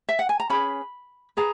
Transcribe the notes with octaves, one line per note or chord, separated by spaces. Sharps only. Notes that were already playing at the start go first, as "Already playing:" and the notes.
E5
F#5
G#5
A#5
C#4 G#4 B4 B5
G#4 B4 A#5